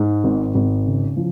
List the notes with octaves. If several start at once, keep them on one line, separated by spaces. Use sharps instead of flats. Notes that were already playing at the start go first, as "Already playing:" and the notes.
Already playing: G#2
G#1
G#1
C#3
F3